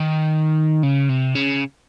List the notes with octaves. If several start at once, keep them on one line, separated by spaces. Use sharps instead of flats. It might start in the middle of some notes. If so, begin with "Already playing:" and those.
Already playing: D#3
C#3
C3
C#3